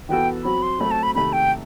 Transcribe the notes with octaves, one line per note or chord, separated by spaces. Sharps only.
E3 B3 F#4 A4 G5
F#3 C4 F#4 B5
C6
F#3 A3 C4 B5
A5
B5
C3 D#3 A3 B5
G5